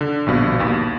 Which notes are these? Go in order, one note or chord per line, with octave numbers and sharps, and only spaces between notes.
D3
A#1 G2 B2
D#2